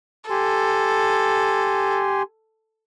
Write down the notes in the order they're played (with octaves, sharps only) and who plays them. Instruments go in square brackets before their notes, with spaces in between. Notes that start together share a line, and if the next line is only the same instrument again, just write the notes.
[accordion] G4 G#5 C6 [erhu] A4